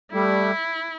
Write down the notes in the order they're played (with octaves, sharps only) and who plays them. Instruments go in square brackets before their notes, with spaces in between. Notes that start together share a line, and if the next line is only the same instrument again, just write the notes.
[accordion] G3 A3 [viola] E4